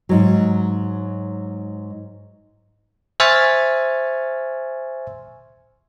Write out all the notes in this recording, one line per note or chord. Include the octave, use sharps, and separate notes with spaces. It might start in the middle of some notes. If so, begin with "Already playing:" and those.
G#2 F#3
C5 E5 G#5 C#6 F6 A6